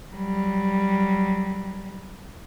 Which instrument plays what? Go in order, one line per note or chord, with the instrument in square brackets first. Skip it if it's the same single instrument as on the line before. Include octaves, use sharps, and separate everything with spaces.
[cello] F#3 G3